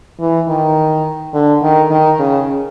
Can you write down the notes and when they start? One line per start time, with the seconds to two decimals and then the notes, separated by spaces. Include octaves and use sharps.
0.20 E3
0.48 D#3
1.34 D3
1.62 D#3
1.90 D#3
2.19 C#3